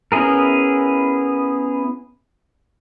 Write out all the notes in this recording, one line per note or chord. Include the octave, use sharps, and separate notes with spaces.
B3 C#4 E4 G#4 A#4